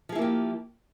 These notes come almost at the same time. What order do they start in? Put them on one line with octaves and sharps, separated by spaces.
F3 G#4 E4 A#3 G4